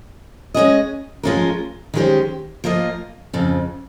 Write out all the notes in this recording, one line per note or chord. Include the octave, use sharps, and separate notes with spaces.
G#3 C#4 G#4 D#5
F3 G#3 C#4 F4 A#4
D#3 G#3 C#4 G4 C5
F3 A#3 F4 A#4 D#5
F2 C#3 F3